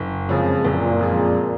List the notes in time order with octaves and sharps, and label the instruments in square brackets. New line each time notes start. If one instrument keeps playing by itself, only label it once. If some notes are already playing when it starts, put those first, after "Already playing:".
Already playing: [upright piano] F#1
[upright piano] F2 F3 G#3 [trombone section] C#3
[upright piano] F#1 [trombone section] A#2
[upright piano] F2 F3 G#3